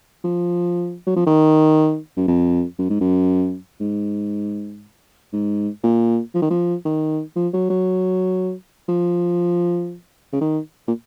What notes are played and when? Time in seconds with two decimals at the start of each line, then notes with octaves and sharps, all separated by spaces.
0.24 F3
1.06 F#3
1.16 F3
1.26 D#3
2.17 F#2
2.28 F2
2.79 F#2
2.90 G#2
3.00 F#2
3.80 G#2
5.33 G#2
5.83 A#2
6.34 F3
6.42 D#3
6.50 F3
6.85 D#3
7.36 F3
7.53 F#3
7.70 F#3
8.88 F3
10.33 C#3
10.41 D#3
10.87 A#2